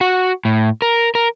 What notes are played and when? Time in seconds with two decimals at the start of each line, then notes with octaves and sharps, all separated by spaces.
0.01 F#4
0.45 A2
0.82 A#4
1.15 A#4